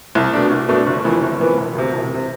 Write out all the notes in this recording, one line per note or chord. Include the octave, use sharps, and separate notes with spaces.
C2
B2 A3 D4
C2
B2 A3 D4
G1
F2 E3 B3
G1
F2 E3 B3
E1
D2 C3
E1
C3